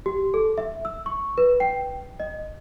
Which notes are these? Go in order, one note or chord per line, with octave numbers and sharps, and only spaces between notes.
G4
A4
E5
E6
C#6
B4
G5
D#5